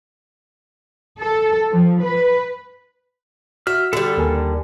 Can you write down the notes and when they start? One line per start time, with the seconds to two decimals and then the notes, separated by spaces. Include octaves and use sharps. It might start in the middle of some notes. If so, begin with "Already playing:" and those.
1.20 A4
1.70 F3
2.00 B4
3.67 F#4 E5 F6
3.93 D3 G3 A4 D5
4.17 D#2 A#4 G#5